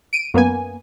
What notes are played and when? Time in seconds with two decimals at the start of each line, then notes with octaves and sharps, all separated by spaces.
0.13 D7 D#7
0.34 F#2 A#3 B3 G#5